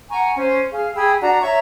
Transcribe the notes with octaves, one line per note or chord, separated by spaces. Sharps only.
F#5 G#5 A#5 C#6
C#4 C5
G#4 F5
G#4 G5 B5 E6
D4 F#4 A#5
C#5 E5 A#5 C#6